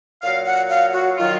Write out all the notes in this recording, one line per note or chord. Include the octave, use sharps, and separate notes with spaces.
A#2 F#3 F5
F#5
F5
F#4
D#3 F#3 F4